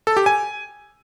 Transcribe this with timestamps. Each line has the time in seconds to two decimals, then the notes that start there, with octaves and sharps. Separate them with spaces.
0.07 A4
0.17 G4
0.26 G#5